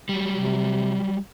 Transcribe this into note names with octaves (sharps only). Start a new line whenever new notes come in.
F#3 G3
C3